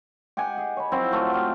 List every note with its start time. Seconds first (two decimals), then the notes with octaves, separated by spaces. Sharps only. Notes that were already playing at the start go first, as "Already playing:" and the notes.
0.37 G4 D#5 F#5 G#5
0.57 G#4
0.77 C#5 B5
0.92 F3 F#3 C4 E4
1.12 F#3 A3 F4
1.33 G4 D#5 F5